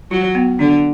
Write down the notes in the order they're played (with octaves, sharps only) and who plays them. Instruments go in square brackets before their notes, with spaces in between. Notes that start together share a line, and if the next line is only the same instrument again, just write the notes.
[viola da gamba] F#3 [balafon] F4
[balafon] B3
[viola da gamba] D3 [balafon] D4